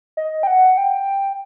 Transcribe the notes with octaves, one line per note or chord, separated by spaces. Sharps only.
D#5
G5
F#5
G5